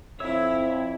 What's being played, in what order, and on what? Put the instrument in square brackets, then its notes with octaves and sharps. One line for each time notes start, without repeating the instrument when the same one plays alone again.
[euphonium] F2 [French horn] C4 [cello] E4 [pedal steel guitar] C#5 E6